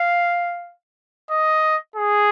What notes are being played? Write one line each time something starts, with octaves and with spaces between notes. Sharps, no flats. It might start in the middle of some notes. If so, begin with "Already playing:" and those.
Already playing: F5
D#5
G#4